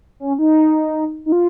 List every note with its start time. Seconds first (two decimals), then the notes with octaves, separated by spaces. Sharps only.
0.20 C#4
0.39 D#4
1.26 D#4
1.32 F4